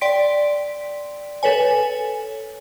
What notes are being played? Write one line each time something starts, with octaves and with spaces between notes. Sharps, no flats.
D5 G5 C6 B6 D7
A4 B4 C#5 G#5